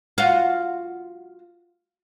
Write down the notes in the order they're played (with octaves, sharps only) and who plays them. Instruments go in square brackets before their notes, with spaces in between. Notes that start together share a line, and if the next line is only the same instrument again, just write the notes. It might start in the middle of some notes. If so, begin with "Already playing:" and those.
[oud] F4 F#4